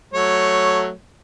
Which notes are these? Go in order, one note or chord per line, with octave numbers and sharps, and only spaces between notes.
F#3 A3 C#5